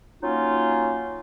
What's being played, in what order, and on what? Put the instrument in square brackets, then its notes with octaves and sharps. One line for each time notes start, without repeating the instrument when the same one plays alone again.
[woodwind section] F#3 A#3 C#4 D#4 F4